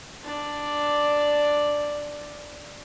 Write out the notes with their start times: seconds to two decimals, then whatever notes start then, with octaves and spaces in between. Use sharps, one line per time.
0.23 D4 D5